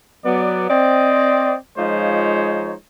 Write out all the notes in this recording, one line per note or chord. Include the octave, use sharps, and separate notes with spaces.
F#3 B3 D5
C4 D5 D#5
F3 G#3 D#4 F4 C5 C#5